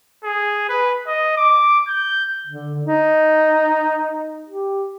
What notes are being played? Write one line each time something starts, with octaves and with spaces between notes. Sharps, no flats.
G#4
B4
D#5
D6
G6
D3
D#4
G4